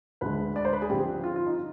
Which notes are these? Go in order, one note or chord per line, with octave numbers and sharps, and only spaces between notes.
D2 D3 G#3 B4
D5
C5
B4
G#4
G2 D3 F3 C4 G4
F4
F4
D#4